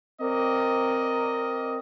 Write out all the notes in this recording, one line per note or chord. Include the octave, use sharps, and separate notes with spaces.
C4 A#4 D5 D#5